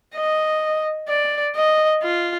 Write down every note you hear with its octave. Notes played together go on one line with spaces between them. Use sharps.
D#5
D5
D#5
F4